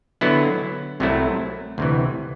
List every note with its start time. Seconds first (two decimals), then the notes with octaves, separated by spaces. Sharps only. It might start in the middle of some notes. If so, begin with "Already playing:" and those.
0.21 D3 F#3 B3 E4
1.00 C2 C3 F#3 A3 E4
1.78 D2 C3 E3